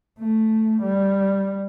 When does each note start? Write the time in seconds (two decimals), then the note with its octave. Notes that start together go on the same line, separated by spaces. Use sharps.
0.19 A3
0.82 G3